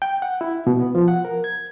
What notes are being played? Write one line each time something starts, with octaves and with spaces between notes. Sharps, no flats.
G5
F#5
E4
B2
B3
F3
F#5
A#4
G#6